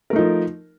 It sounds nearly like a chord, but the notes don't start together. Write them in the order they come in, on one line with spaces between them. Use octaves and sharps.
A#4 A3 D#4 F3